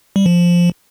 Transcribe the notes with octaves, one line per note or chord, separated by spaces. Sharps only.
G3
F3